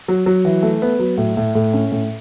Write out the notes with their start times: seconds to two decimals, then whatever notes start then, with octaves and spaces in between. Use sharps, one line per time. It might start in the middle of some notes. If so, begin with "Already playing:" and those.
0.08 F#3
0.26 F#3
0.45 E3
0.63 A3
0.82 B3
0.99 F#3
1.18 A2
1.37 A2
1.55 A2
1.73 C#4
1.92 A2